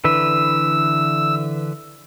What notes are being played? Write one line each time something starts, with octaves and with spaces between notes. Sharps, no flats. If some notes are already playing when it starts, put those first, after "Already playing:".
D3 E3 B4 E6